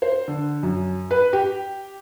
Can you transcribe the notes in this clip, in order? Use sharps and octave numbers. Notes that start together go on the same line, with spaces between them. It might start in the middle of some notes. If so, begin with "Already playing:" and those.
C5
D3
F#2
B4
G4